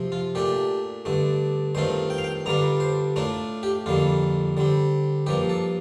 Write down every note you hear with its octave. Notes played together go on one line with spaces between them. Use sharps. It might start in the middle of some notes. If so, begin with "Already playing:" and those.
Already playing: C3 F3 C4
F4
A#2 A3 D4 G4
G2 D3 A3
G2 D#3 A3 C4 F4 C5
G5
F5
G5
G2 D3 G3 D4 F4 A#5
C5
A2 A3 D4 F4 A#4
G4
F2 D3 G3 A#3 F4
D3 G3 C4
G2 F3 A#3 G4
A4